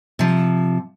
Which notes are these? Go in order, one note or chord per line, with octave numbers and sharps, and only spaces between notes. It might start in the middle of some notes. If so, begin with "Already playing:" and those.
C3 F3